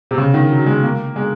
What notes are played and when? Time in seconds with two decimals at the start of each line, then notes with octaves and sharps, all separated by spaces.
0.11 C3
0.18 C#3
0.34 D#3
0.50 F#3
0.66 G#3
0.83 A#3
1.16 G#3